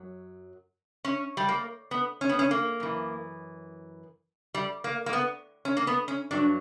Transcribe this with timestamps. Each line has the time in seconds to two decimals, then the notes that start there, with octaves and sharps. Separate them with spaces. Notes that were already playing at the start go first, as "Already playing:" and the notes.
Already playing: F#2 F#3
1.05 C#4
1.37 G3
1.49 A#3
1.91 B3
2.21 C#4
2.29 B3
2.39 C#4
2.51 A#3
2.80 F#2 E3
4.55 G3
4.84 A#3
5.06 A#3
5.13 B3
5.65 C#4
5.77 A#3
5.87 B3
6.08 C#4
6.31 G2 F#3 D4